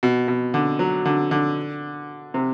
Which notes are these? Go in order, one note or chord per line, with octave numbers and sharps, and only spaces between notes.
B2
B2
D3
F#3
D3
D3
C3